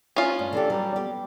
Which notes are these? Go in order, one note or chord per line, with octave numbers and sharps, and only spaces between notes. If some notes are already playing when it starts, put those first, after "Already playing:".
C#4 F4
G2 A3
E3 D4 G4 A4 D5
F#3 G3
B3 G4